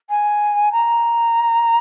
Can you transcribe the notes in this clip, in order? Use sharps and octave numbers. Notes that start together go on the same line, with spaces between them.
G#5
A#5